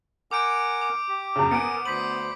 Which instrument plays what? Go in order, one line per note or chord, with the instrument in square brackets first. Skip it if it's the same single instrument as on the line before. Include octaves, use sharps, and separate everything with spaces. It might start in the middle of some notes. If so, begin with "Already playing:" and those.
[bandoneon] A#4 F#5 G#5 [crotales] D6 G6 D7
[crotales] D6
[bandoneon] G4
[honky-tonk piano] F#2 C#3
[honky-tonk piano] B3 D7 [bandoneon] A#4 G#5 [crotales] C#7
[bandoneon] D2 C5 B5 [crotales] B6 F#7